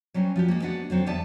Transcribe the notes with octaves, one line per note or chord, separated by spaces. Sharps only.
F#3 G3 C4 C#4
F3 F#4 G4
G#3 A#3
B3 D4 F#4 F#5
D3 F#3 C4 F#4
E2 D3 B3 G4 D5 A5